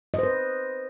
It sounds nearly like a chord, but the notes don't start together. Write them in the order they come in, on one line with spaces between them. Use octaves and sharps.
D#5 C5 B4